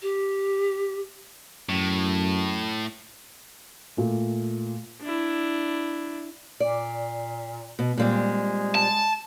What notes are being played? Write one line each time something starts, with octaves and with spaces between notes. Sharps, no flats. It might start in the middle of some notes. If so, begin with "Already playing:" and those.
G4
F#2 A2
A#2 A3
D4 E4
A#2 D5
B2
A#2 G3 G#3 C4
A5